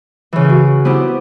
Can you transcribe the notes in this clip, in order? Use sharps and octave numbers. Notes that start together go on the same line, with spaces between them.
C#3 E3
F#4
B3 C4 E4 G4